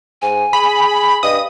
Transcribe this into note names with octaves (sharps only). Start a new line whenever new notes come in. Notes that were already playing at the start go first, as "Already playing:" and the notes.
G#2 G#5
G#4 B5
G2 D#5 D#6